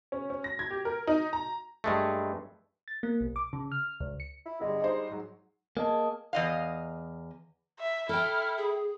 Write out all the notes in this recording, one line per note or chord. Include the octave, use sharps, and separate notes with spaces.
C#4
C#4
A#6
G#6
G4
A#4
D#4
A#5
G2 G#3 A3
A6
A#3
B1
D6
C#3
F6
C#2
C#7
E4
G1 G3 G#3
G3 D#4 C5
G#2 F#3
A#3 G#4 D#5 A5
E2 D#5 F5
E5
E4 A4 G5 F6
G#4